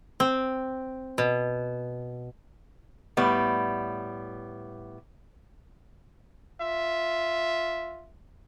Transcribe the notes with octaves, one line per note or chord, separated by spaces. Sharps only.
C4
B2
A2 G3 B3
F4 E5